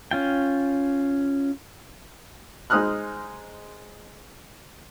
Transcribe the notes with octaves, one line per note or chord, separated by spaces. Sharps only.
C#4 F4 G5
G#3 D#4 C5 D#6 F6 F#6